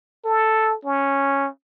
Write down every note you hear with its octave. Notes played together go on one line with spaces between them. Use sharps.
A4
C#4